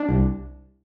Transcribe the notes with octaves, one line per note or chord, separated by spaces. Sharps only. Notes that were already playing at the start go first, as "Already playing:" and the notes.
Already playing: D4
C2